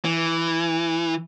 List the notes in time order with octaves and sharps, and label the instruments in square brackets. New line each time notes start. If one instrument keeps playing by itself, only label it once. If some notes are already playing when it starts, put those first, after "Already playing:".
[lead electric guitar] E3